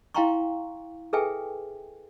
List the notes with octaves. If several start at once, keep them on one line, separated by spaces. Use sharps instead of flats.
E4 F5 G5 A#5 C6 C#6
G#4 A4 B4 E5 G5 G#5